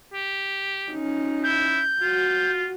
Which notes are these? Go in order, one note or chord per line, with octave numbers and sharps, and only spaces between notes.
G4
C#4 D#4
E4 G6
F4 F#4